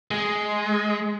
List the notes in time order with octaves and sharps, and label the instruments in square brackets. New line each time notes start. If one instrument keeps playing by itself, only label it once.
[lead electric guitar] G#3